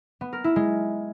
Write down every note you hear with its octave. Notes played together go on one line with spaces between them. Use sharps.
B3
A#4
E4
G#3